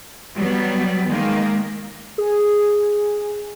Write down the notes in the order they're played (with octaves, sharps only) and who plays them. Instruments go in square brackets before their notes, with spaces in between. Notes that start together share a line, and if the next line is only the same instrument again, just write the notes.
[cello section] F#3 G3 B3
D#3 G#3 A#3
[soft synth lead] G#4